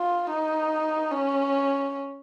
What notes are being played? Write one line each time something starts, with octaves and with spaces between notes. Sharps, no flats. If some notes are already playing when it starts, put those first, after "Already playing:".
Already playing: F4
D#4
C#4